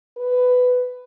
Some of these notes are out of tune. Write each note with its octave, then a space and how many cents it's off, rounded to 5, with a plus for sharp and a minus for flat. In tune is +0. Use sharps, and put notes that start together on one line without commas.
B4 +15